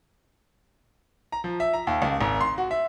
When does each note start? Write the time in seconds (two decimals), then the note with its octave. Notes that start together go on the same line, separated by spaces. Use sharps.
1.32 A#5
1.44 F3
1.60 E5
1.73 A#5
1.87 D#2
2.02 C#2
2.21 G#1
2.41 C6
2.58 F#4
2.71 E5